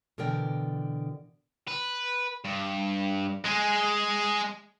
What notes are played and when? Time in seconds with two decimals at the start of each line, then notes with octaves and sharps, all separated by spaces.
0.18 B2 D3 E3 A#4 D5 G5
1.67 B4
2.44 G2
3.44 G#3 G#4